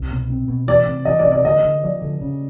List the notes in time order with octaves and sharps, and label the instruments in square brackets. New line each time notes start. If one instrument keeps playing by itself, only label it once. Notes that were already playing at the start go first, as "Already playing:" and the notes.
Already playing: [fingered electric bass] C2
B2
C4
B2
[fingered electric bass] E3 [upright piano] D5
[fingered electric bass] C3
[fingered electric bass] E3 [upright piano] D#5
[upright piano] D5
[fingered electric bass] C3
[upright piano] D5
[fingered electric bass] D3 [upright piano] D#5
[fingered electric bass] D3
[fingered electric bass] F3 [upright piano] D5
[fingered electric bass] D3
C#3